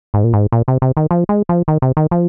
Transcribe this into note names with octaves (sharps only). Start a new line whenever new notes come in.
G#2
A#2
G#2
A#2
C3
C3
D#3
F3
G#3
F3
D#3
C3
D#3
F3